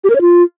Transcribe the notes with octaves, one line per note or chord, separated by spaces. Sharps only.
G4
A#4
C#5
F4